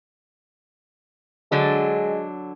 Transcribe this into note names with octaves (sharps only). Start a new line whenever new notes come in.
D3 F#3 G#3 D4